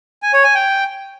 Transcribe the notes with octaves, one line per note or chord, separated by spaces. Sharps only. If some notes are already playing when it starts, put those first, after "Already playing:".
G#5
C#5
G#5
G5